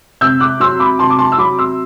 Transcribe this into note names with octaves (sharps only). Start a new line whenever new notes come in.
C3 E6 G6
D6 F#6
F#3 C6 E6
B5 D6
C3 A5 C6
D6
A5 C6
E6
F#3 B5 D6
C6 E6